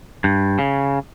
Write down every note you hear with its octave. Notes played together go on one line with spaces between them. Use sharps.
G2
C#3